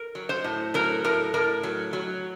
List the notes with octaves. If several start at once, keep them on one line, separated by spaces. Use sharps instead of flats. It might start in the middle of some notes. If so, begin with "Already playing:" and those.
Already playing: A#4
F#3
C5
A2
F#3 A#4
A2 A#4
A2 A#4
F#3
F#3